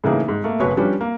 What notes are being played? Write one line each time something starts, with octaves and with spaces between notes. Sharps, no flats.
A2 C#3 E3 A#3 D#4 G#4
G#2
A3 A#3
F#1 B2 B4 C#5 G#5 C#6
F3 G3 B3 C#4 D4
A#3